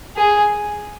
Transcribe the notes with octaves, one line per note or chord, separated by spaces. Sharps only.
G#4